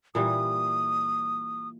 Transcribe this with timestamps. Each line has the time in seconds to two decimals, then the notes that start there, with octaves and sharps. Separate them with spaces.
0.15 A#2 E3 G3 D#6